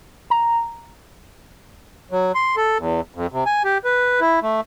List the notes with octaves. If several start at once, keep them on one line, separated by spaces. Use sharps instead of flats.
A#5
F#3
C6
A4
E2
F2
C3
G#5
G4
B4
E4
A3